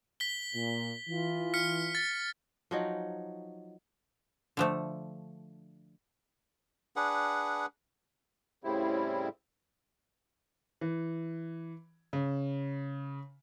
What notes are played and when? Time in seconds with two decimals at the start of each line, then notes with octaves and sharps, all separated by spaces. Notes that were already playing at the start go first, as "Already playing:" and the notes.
0.20 B6 G7
0.54 A#2
1.09 E3 F4
1.54 F6 B6 C#7
1.95 A6
2.71 F3 F#3 D#4
4.57 D3 F3 A3
6.96 D4 G#4 B4 F#5
8.64 A2 C#3 G3 C4 E4
10.81 E3
12.13 C#3